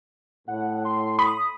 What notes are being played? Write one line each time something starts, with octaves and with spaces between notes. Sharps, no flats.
A2 F#5
C6
B5 D#6